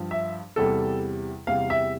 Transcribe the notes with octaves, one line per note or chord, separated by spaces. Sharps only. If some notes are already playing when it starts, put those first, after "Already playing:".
Already playing: G2 F3
E5
E2 C3 G3 A4
E2 C3 G3 F5
E5